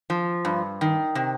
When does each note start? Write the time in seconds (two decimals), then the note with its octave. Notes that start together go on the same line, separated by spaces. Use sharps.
0.10 F3
0.45 G2
0.81 D#3
1.15 C3